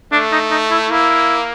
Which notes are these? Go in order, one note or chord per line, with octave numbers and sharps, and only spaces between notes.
A3 D4
D#4
D#4
E4
A#3 E4